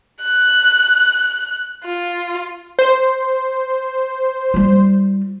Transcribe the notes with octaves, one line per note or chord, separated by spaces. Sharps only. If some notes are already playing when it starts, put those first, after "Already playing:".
F#6
F4
C5
G3 F4